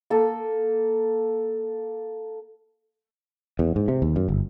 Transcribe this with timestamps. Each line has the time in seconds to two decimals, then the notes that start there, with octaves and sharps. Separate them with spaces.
0.10 A#3 A4
3.59 E2
3.76 G#2
3.88 C3
4.02 D#2
4.16 F#2
4.28 G1